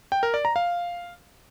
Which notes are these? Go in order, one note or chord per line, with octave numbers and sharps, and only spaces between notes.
G5
A#4
D5
A#5
F5